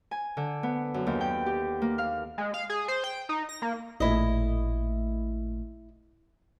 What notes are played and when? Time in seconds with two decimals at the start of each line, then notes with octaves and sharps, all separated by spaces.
0.11 G#5
0.37 D3
0.63 B3
0.94 F#2
1.07 D#2
1.21 G5
1.46 G4
1.82 A#3
1.98 F5
2.38 G#3
2.54 F5
2.69 G#4
2.88 C5
3.04 G5
3.29 D#4
3.49 A#6
3.62 A#3
4.00 A1 A#2 A3 E4 D#5